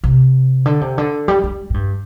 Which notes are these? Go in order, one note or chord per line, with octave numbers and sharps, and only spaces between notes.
C3
D3
C3
D3
G3
G3
A2
G2